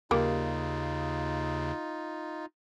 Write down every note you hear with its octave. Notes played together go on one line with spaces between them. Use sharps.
D#2 C#3 G3 A#3 D#4 F4